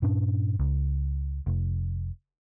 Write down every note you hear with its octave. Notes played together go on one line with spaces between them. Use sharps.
G2 A#2 C#4 D4
C#2
F1